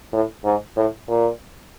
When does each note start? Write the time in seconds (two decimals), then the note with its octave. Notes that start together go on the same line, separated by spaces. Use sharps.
0.13 A2
0.44 G#2
0.76 A2
1.08 A#2